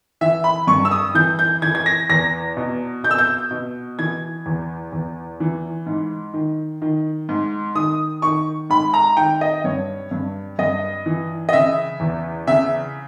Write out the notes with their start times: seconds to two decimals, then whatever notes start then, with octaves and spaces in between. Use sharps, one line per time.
0.21 E3 E5
0.44 B5
0.67 G2 C#6
0.85 E6
0.91 D#6
1.15 E3 G6
1.39 G6
1.62 E3 G#6
1.75 G#6
1.86 A#6
2.09 E2 A#6
2.57 B2
3.04 B2 G6
3.11 E6
3.18 G6
3.51 B2
3.99 E3 G#6
4.46 E2
4.93 E2
5.40 E3
5.86 G#2
6.34 D#3
6.82 D#3
7.29 G#2
7.75 D#3 D#6
8.22 D#3 C#6
8.70 G#2 B5
8.94 A#5
9.17 D#3 G5
9.41 D#5
9.64 G2 C#5
10.11 G2
10.59 G2 D#5
11.06 E3
11.49 D#5
11.53 C#3 E5
12.00 E2
12.47 C#3 E5